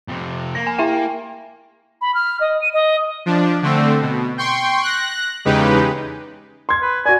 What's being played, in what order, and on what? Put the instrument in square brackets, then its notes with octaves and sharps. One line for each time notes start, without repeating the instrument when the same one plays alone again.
[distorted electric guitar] F2 C3
[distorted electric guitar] A#3 [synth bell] A#6
[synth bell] G#5
E4 E5 G5
[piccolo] B5
F6
D#5
D#7
D#5
[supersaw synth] F3 D4
D3 A3 C4
B2
G5 C6 C#6
F#6 A#6
E2 C#3 G#3 D#4 G4 B4
[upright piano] C6 G#6
[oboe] B4
[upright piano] F#4 D5 [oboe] G#5